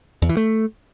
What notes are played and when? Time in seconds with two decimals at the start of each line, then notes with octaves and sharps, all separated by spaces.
0.22 E2
0.29 E3
0.37 A3